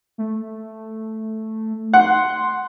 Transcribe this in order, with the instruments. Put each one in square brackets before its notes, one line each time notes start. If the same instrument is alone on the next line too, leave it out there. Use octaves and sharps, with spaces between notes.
[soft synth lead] A3
[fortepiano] F#5 [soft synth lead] C6